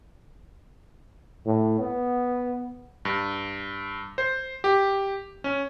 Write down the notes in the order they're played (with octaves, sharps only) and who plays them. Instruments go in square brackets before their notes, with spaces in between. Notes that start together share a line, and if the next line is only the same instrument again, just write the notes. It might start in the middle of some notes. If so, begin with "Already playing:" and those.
[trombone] A2
B3
[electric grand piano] G2
C5
G4
C#4